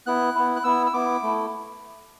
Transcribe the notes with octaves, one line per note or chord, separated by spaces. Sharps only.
B3 E4 F#6
B3 E4
F#6
B3 E4 E6
E6
B3 E4 D6
A3 E4